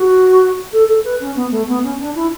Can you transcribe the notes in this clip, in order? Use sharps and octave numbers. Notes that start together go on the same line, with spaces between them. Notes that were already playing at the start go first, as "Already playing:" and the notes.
Already playing: F#4
A4
A4
B4
C#4
B3
A3
B3
C#4
D4
E4